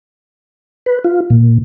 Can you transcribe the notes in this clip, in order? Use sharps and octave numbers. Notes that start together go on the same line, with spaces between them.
B4
F4
A#2